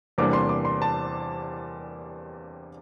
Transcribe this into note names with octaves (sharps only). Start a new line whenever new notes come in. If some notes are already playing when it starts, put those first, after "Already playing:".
E2 C3 G3 A#3 D4 D6
C6
D6
C6
A5